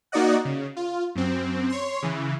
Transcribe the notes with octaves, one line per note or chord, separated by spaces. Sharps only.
A#3 D#4 F#4 D5 D#5 F#5
C#3
F4
F#2 C4
C#5 C6
C#3 E3